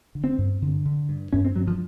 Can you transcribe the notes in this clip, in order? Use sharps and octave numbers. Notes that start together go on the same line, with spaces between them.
D3
C4
G2
D3
D3
G2
G2 C#4
C4
G2 F#3
F3